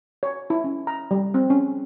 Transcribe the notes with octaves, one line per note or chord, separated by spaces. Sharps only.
C#5
E4
C#4
A#5
G3
C4
C#4